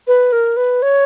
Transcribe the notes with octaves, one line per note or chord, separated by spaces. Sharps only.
B4
A#4
B4
C#5